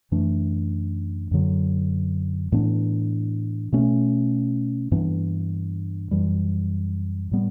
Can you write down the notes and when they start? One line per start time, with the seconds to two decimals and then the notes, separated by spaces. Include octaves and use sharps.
0.12 F#2 E3 A3 D4
1.31 F#2 D3 F#3
2.52 A2 E3 B3 D4
3.72 B2 A3 C#4
4.91 G2 E3 B3 D4
6.11 F#2 E3 G3
7.31 A2 G3 B3